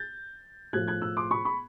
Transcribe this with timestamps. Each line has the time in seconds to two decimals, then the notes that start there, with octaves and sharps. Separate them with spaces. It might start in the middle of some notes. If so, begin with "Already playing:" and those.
Already playing: G6 A6
0.73 A2 F3 A3 F#6 G#6
0.87 F#6 G#6
1.02 E6 F#6
1.17 C6 D6
1.31 B5 C#6
1.45 B5 C#6